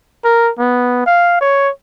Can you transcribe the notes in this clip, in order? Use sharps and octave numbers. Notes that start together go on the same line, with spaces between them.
A#4
B3
F5
C#5